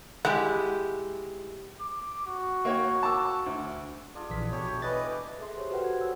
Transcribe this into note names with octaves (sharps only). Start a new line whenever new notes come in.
G#3 E4 G4 F#5
D6
F#4
A#3 C#5 G5
A5 D6 E6
D2
D4 F4 G#4
A#1 E3 B6
B2 E4 G4 A4 C#5
E3 B4 D#5 D6 A6
G#4 A4 E5 C6
G4 C5 C#5
F#4 A4 B4 C5 F#5 G5
F#5 G#6
E6